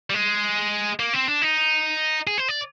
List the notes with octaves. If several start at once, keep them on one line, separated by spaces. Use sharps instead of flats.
G3
G#3
A#3
C4
D4
D#4
G#4
C5
D5